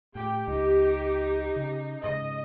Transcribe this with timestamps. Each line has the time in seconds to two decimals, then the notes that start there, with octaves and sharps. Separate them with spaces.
0.15 A2 G4 G5
0.48 C#2 D#4
1.56 C#3
2.04 G#2 C#3 D#5